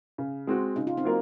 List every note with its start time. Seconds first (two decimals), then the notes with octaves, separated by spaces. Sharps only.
0.18 C#3
0.47 G#3 C4 F#4
0.76 C#3 D#4
0.87 F4
0.97 C4 D#4
1.04 F#3 A#3 F4 A#4